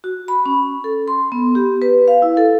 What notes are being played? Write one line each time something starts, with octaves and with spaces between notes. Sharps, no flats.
F#4
B5
C#4
A4
C6
B3
G4
B4
F5
E4
A4